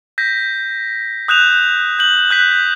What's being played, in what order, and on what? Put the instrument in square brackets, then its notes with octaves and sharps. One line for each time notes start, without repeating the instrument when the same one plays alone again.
[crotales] G6 A#6 B6
D#6 F#6 G6 E7 F7
G6 F#7
F#6 G6 B6